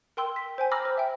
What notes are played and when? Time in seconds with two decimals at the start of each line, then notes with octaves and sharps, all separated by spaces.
0.17 A#4 G5 C6 E6
0.36 B6
0.58 C5 G5 G#5
0.71 A#5 B5 D6 E6 F6 A#6
0.85 C5
0.98 E5 G5